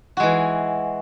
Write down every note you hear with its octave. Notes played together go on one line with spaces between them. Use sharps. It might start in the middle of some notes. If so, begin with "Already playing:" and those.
E3 G#3 F#4